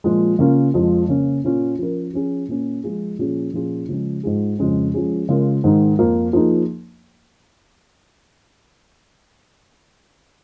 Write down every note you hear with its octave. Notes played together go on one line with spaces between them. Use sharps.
A#2 F3 G#3
C#3 A#3 C#4 F4 A#4
F2 F3 G#3 F4
C#3 A#3 C#4
A#2 A#3 C#4 F4
F3 C#4 A#4
F3 C#4 G#4
A#2 A#3 C#4
F3 G#3 F4 G#4
A#2 F3 C#4 G#4
A#2 F3 C#4 F4 G#4
C#3 F3 G#3 C#4
G#2 G#3 F4 G#4
F2 C#3 G#3 C#4
F3 G#3 C#4 G#4
C#3 G#3 F4 A#4
G#2 D#3 G#3 D#4
F2 F3 A#3
F3 A#3 D#4 G#4